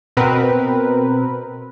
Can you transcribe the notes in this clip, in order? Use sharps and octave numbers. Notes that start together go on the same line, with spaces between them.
B2 C4 A#4 B4